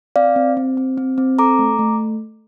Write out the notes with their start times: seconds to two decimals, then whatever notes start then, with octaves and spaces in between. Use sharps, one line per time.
0.16 C4 D5 F5
0.36 C4
0.57 C4
0.77 C4
0.98 C4
1.18 C4
1.39 A4 A#5 D6
1.59 A3
1.79 A3